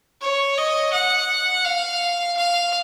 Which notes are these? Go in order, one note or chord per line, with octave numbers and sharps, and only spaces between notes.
C#5
D#5
F#5
F5
F5